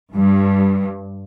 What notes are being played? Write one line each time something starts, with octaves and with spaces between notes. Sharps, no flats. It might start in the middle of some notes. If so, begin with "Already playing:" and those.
G2